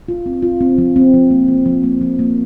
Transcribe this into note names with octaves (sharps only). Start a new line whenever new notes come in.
F4
C4
F4
C4
F3
C4
F3
A#3
F3
F3
A#3
F3
A#3